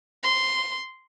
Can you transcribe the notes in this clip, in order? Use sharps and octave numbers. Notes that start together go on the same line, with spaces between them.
C6